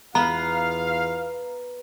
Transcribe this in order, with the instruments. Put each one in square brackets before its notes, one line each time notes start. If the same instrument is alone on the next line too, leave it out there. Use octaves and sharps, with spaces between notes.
[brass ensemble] E2 F4 F5 [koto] B3 [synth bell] A#5